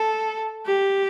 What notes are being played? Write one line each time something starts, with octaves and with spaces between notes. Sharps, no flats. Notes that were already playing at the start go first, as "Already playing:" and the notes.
Already playing: A4
G4